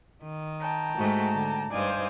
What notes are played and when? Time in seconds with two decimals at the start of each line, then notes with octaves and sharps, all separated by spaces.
0.22 D#3
0.60 G5 A5 A#5
0.97 G#2 A3 F#4
1.34 D3
1.71 G2 D#4 C5 D5 F5 G#5